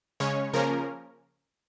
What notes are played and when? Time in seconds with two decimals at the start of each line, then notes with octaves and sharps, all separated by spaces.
0.20 C#3 G#3 C#4 C#5
0.53 C#3 F3 A#3 C#4 A#4